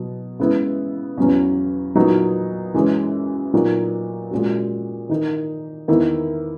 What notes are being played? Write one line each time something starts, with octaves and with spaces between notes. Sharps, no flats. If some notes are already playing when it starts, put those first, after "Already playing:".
Already playing: B2 F#3
C#3 G#3 B3 E4
E2 C#3 F#3 C#4
A#2 F#3 B3 D#4 F#4
F#2 C#3 E3 G#3 C#4
A#2 F#3 B3 D#4 F#4
A#2 G#3 C#4 F#4
D#3 A#3 D#4
E2 D#3 A#3 E4